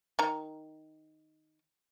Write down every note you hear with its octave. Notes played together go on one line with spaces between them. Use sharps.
D#3 A#5